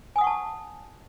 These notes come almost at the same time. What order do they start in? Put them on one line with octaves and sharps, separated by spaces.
G#5 D#6 F#5 C#6 A5